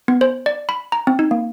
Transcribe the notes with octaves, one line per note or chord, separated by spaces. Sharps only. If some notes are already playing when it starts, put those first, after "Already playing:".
B3
C5
D5
B5
A#5
C4
D#4
A#3